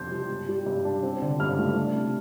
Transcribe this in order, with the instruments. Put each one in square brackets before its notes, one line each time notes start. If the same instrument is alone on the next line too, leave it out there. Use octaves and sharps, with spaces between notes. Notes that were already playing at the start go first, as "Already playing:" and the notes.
Already playing: [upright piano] F2 C3 D4 A5 C6 G6
G3
G2
G3
G2
D4
C4
D3
G2 F6
A3
D4
C3